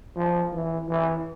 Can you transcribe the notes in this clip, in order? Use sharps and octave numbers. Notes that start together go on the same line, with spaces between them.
F3
E3
E3